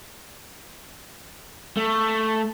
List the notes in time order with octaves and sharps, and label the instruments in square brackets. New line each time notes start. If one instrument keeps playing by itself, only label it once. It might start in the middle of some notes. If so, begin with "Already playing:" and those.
[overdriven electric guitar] A3